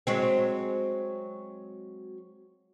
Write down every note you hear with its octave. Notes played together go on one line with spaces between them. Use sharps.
F#3 G#3 C4